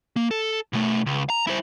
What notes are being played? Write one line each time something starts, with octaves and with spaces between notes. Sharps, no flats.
A#3
A4
B2 A3
C#2
A#5
E4 C5